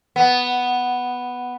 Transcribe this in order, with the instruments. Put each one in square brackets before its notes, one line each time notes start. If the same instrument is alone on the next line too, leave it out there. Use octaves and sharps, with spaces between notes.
[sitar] B3